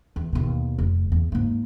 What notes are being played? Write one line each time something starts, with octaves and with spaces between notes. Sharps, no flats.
E2
D#2 B2
F1
E2
G#2 A#3